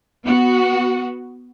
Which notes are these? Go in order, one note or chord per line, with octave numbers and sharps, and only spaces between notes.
B3 F#4